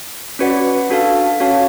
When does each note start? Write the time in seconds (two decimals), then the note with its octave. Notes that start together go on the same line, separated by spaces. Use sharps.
0.39 C#4 F#4 B4 D5 F#5
0.90 D4 F#4 A4 F5 A5
1.40 C#4 F#4 C#5 F5 A5